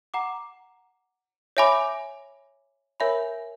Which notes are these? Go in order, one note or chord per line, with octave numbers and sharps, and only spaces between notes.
F#5 A#5 D6
C#5 E5 G#5 B5 D6
A#4 C#5 E5 G#5 B5